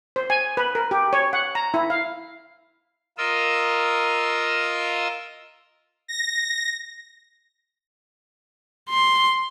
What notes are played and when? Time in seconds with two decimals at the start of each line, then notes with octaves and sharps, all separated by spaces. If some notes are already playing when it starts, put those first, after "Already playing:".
0.16 C5
0.30 G#5
0.57 B4
0.75 A#4
0.91 G4
1.13 C#5
1.33 F#5
1.55 A#5
1.74 E4
1.90 F5
3.18 F4 A#4 D#5 E6
6.08 A#6
8.91 C6